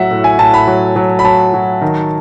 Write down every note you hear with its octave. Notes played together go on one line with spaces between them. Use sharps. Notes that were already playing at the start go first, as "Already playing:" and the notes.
Already playing: A2 F#3 E5 F#5
A2
G#5
A2 A5
B5
F#3
F#3
B5
F#3 A5
F#3
D#3